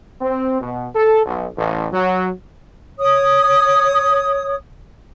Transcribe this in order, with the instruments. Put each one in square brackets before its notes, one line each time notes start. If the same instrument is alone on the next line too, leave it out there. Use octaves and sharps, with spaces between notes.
[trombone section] C4
B2
A4
B1
A1
F#3
[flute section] C#5 D#6